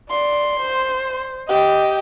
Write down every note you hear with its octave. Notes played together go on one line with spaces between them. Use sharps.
D5 C6
C5
G4 D#5 G5